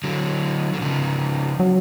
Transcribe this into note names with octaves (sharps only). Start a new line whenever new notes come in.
D3 F#3
D3
C#3 F3
F#3